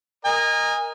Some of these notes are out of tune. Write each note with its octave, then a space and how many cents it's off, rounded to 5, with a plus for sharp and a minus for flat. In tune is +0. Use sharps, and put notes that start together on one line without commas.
A#4 +5 D#5 +0 G#5 -30